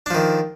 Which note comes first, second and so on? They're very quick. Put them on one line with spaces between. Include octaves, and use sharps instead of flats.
D4 F3 D#3